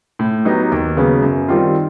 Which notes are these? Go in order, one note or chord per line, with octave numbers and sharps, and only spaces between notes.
A2
F#3 B3 D#4 G4
D#2
C#3 F#3 B3
F#2
D#3 G3 C4 F4